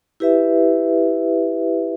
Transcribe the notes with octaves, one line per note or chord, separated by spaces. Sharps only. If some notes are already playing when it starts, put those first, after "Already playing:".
E4 G4 B4 E5